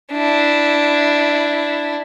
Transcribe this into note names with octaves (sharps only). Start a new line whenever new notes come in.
D4 E4